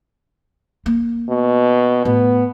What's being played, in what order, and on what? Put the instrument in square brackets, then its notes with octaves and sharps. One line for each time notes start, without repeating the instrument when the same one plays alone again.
[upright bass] A#3
[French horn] B2
[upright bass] A2 [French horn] B3